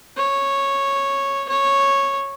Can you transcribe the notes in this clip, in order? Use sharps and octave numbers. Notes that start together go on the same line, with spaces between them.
C#5
C#5